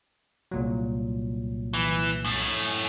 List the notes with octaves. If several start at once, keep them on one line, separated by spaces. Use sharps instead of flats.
C2 A#2 F#3
E3
F#2 A2